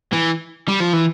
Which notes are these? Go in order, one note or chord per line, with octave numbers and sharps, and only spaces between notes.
E3
G3
F3
E3